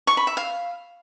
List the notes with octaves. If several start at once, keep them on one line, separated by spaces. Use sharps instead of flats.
C#6
B5
E5
F5